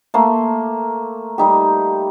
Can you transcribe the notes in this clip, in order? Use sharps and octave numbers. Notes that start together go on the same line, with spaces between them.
A3 A#3 C6
G3 D#4 G4